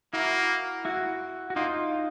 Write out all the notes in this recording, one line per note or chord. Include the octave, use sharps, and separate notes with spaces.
A#3 E4 F#4
E4 F#4
F#4
A#3 D#4 F4